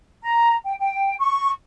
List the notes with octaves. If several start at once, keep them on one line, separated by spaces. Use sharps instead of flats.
A#5
G5
G5
C#6